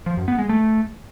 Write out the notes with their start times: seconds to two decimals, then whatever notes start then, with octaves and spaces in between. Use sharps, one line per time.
0.06 F3
0.17 F#2
0.28 B3
0.39 G#3
0.49 A3